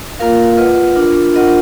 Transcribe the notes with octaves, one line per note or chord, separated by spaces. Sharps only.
A#3 F4 A#4 F5
F4 B4 D#5 F#5
D4 F4 A#4
D4 F4 A#4 D#5 F#5